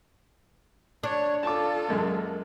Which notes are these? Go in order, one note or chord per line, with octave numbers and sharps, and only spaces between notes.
D4 C#5
F4 A4 A5 D6
F#2 G#3 A#3